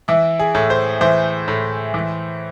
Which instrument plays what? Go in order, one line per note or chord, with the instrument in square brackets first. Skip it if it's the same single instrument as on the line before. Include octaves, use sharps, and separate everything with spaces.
[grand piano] E3 E4
G#4
A2
C5
E3 C5
A2
E3